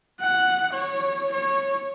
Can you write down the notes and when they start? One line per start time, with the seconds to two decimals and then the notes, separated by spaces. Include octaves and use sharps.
0.21 F#5
0.74 C#5
1.33 C#5